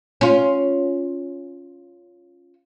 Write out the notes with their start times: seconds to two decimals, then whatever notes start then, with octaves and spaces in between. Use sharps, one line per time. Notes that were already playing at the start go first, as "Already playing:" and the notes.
0.21 C#4 F4